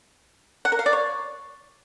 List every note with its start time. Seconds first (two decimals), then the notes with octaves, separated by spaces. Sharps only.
0.65 F#5
0.72 A#4
0.79 F5
0.86 D5
0.93 C#5